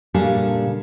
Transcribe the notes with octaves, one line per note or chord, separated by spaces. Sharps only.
A#2 C#3 G3 D4 G#4 A4